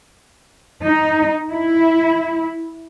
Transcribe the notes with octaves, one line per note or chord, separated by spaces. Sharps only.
D#4
E4